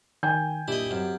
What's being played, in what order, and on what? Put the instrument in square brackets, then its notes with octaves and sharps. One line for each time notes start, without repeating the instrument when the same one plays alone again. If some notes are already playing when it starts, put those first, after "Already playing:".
[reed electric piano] D#3 [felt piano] G5 G#5 G6
[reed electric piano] A#2 D4 [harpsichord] E4 D#5 [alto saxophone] G4
[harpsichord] F#2 [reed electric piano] C4